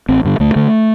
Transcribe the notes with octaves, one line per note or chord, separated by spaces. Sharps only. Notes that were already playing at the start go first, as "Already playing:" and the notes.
A1 C4
G2 D3
D2 A3
D3 A3